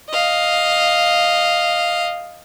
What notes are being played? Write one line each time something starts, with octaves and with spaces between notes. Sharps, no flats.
D#5 F5